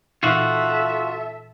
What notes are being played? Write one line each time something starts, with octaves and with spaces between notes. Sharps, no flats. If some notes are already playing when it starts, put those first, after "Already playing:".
A#2 E3 D#4 F4 F#4 A4 E5